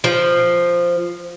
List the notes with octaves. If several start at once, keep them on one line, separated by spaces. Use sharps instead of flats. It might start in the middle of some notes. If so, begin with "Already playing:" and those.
F3